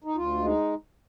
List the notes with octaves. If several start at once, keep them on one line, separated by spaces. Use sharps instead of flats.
D#4
D2 F4
G#3
D#4